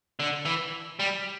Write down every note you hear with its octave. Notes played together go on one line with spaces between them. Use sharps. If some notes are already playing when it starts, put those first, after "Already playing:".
D3
E3
G3